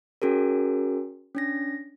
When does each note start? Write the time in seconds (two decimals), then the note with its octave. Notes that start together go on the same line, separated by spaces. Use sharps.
0.22 C#4 F#4 G#4 A#4
1.35 C#4 D4 A#6